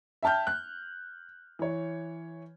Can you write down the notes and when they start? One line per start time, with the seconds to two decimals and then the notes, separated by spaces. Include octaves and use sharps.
0.23 E5 G5 A5 F6 G6
0.47 F#6
1.59 E3 C#5